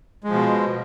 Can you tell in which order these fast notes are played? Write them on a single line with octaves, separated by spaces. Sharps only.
G#3 F3 B2